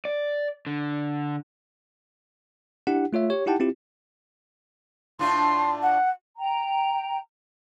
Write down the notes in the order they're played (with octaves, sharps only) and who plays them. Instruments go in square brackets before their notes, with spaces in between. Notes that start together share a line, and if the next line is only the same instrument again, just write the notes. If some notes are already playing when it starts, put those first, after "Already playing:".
[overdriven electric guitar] D5
D3
[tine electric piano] D4 E4 G4 F#5
A3 F4 C#5 E5
G4 C#5
D#4 E4 G4 F#5 G5 A5
C4 E4 F4 G4
[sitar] A2 D4 F4 [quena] C6
[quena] F#5
[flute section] G5 A#5